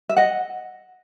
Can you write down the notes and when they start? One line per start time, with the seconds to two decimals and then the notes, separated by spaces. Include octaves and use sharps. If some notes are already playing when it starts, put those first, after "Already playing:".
0.09 E5
0.17 D#5 F#5